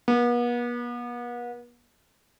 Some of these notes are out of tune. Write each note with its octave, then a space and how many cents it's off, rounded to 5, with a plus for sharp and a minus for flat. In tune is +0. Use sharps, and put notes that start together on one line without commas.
B3 -40